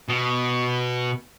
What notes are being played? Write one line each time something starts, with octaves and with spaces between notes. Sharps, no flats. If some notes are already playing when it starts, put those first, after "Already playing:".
B2